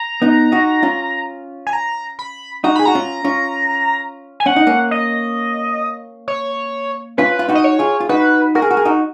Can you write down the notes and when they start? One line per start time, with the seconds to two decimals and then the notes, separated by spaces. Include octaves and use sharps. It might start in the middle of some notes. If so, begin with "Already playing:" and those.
Already playing: A#5
0.22 B3 D#4
0.52 D#4 F#4
0.83 C#4 F4
1.67 G#5
1.73 A#5
2.19 B5
2.64 D#4 F#4 A#5
2.76 G#4 B5
2.85 F#4 A#5
2.95 C#4 F4
3.24 C#4 F4
4.40 G#5
4.46 C#4 F#5
4.56 D#4
4.67 A#3 C#4
4.91 D#5
6.28 C#5
7.18 C#4 F4 B4
7.39 F4
7.49 D#4 F#4
7.55 D#5
7.64 C#5
7.79 F4 G#4
8.00 F4
8.09 D#4 F#4 B4
8.55 F#4 A#4
8.62 G#4
8.71 F#4
8.77 G#4
8.85 D#4 F#4